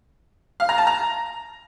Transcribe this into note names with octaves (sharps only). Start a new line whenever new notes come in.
F5
A#5
A5
A#5